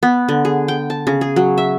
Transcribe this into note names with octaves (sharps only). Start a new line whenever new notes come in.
B3
D3
G#4
G5
A5
C#3
G#4
F#3
E5